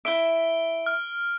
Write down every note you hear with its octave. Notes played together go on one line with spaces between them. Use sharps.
E4 E5 D7 G7
F6